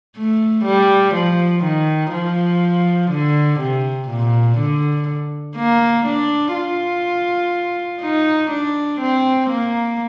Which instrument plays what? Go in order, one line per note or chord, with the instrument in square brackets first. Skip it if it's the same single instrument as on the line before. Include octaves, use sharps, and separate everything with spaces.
[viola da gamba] A3
G3
F3
D#3
F3
D3
C3
A#2
D3
A#3
D4
F4
D#4
D4
C4
A#3